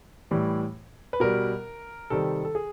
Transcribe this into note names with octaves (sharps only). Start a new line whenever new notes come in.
A2 E3 G3
B4
B2 G3 A#4
C3 D#3 G3 A4
A4
G#4